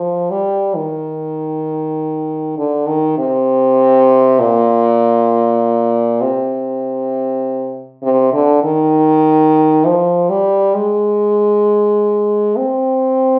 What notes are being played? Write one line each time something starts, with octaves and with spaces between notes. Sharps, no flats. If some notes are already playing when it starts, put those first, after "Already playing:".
Already playing: F3
G3
D#3
D3
D#3
C3
A#2
C3
C3
D3
D#3
F3
G3
G#3
C4